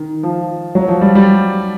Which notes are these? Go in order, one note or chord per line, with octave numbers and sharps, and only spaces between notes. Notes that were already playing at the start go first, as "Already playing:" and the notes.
Already playing: D#3
F3
F#3
F3
G3
G3